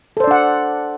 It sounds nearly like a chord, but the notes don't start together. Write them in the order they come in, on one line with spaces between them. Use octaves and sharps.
A4 C5 D5 D4 F#5